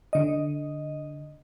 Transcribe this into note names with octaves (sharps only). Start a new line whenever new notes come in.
D3 D#5